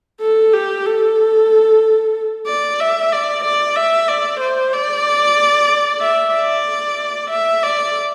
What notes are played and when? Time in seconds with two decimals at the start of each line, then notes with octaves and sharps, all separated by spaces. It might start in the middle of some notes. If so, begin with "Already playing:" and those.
0.21 A4
0.53 G4
0.86 A4
2.47 D5
2.80 E5
3.12 D5
3.45 D5
3.76 E5
4.08 D5
4.40 C5
4.73 D5
6.01 E5
6.34 D5
7.31 E5
7.63 D5